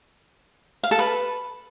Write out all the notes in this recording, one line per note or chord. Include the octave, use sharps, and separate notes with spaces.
F5
A4
B4